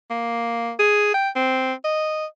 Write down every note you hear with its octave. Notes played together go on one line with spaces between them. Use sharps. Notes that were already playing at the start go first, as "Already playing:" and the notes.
A#3
G#4
G5
C4
D#5